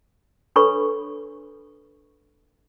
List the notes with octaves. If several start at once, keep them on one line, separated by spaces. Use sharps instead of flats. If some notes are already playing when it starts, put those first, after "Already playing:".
D4 A4 B4 C#5 B5 C#6